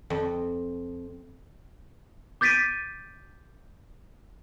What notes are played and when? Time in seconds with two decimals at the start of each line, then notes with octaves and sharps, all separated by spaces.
0.10 F2
2.41 D6 G6 A6 B6 D7 D#7